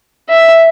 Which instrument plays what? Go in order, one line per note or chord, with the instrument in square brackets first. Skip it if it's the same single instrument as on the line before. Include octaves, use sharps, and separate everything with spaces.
[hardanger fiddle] E5